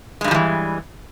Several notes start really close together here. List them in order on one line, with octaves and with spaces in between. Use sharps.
G#3 G2 G3 F3 E3